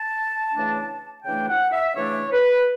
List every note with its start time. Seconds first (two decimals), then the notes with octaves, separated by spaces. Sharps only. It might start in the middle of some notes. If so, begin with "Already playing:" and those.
Already playing: A5
0.53 C#3 E3 A3 D4
1.25 C#3 E3 A3 D4 G5
1.48 F#5
1.72 E5
1.96 C#3 E3 A3 D4 C#5
2.32 B4